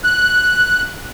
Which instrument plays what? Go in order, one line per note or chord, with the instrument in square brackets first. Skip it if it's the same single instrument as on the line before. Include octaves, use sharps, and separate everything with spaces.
[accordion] F#6